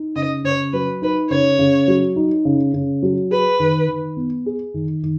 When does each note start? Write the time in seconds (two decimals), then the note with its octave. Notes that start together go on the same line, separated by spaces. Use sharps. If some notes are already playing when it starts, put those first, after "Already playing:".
Already playing: D#4
0.15 C#3 D#5
0.44 C#3 C#5
0.73 F#3 B4
1.02 D#4 B4
1.30 C#3 C#5
1.59 C#3
1.88 F#3
2.16 D#4
2.45 C#3
2.74 C#3
3.02 F#3
3.31 G#4 B4
3.60 D#3
3.88 D#3
4.17 B3
4.46 G#4
4.74 D#3
5.03 D#3